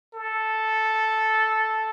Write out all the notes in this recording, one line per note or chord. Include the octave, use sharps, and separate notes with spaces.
A4